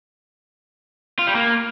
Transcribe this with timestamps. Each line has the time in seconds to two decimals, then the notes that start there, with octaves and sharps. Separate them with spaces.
1.19 F4
1.27 G3
1.35 A#3